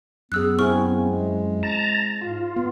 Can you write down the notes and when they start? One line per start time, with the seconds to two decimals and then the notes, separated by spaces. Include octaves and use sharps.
0.32 F#2 B3 G#4 E6 F#6
0.59 C4 E4 G#4 C#6 F6
1.10 G#3
1.63 A5 A#5
2.21 G#2 F4
2.56 B3